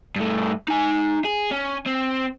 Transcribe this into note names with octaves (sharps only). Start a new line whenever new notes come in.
G2 A3
D#4 G#5
G#4
C#4
C4